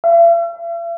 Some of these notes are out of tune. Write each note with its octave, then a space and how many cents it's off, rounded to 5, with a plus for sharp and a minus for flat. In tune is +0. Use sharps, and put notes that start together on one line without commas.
E5 +45